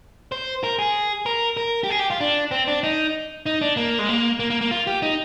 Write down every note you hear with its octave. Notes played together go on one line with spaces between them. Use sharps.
C5
A#4
G#4
A#4
A#4
G4
G#4
G4
F4
D4
C4
D4
D#4
D#4
D4
A#3
G#3
A#3
A#3
A#3
A#3
F4
G4
D#4